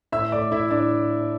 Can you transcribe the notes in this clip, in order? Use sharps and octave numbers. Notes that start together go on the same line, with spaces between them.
A2 E5 E6
A3 D5 D6
A2 E4 E5
A2 D4 D5